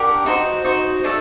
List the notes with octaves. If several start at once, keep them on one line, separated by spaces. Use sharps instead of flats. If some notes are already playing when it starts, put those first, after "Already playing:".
Already playing: D4 G4 A#4 F#5
D#4 F#4 C5
D#4 F#4 C5
A3 D4 A4 D#5